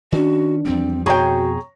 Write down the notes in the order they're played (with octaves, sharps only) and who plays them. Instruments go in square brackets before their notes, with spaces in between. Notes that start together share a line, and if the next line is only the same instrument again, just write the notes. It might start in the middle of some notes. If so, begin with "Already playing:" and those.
[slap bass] D#3 C#4 [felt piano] D4 [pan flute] F#4
[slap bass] E2 F3 G3 [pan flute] C4
[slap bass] F2 B2 [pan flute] F#4 [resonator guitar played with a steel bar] G#4 G5 [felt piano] C#5 A#5 C#6